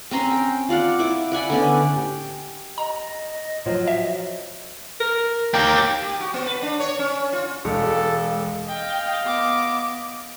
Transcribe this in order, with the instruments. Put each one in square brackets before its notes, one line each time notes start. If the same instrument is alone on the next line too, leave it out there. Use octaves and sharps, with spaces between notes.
[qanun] C4 C#4 A#5 C6
G5
F4 D5 F5 F#5
E4 D6
D5 F#5 G#5 B5
D3 B3 C#4 D5
[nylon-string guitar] G4
[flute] D#5 [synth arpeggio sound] A#5
[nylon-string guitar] F3 F#3 F4
[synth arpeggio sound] E5
[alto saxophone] A#4
[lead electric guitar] A#3 G4 [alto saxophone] G5
[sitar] G4
F#4
B3
B4
D4
C#5
C#4
F4
[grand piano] E1 [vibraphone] G#3 F5 [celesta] G#4 [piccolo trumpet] A4
[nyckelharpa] D#5 F5 [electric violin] G5
[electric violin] B3 D6